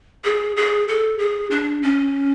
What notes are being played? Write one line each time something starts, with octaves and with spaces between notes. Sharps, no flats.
G#4
G#4
A4
G#4
D4
C#4